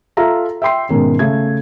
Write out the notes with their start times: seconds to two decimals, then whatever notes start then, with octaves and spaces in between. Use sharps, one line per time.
0.17 F4 A4 E5 A#5
0.62 E5 G5 C6 C7
0.89 G#2 B2 D#3 C#4
1.19 C#3 A3 G#6